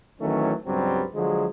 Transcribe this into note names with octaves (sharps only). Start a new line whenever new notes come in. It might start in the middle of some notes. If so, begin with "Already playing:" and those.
D#3 E3 F#3 A3 C#4
C#2 G2 F#3 G3 C4
D3 F3 F#3 G#3